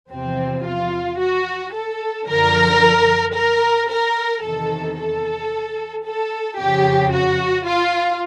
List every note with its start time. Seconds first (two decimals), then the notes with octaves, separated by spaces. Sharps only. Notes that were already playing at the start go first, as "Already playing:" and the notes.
0.11 E2 C3 F3 C4
0.65 F4
1.19 F#4
1.73 A4
2.27 F#2 D3 F3 A#4
3.34 A#4
3.89 A#4
4.42 E2 C3 D#3 A4
4.96 A4
6.04 A4
6.58 F2 C#3 F3 G4
7.12 F#4
7.66 F4